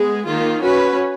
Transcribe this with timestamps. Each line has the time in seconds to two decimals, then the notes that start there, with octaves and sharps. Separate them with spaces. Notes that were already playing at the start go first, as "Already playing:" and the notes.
Already playing: G#3 B3 G#4
0.27 D#3 A#3 F4
0.62 C#4 F#4 B4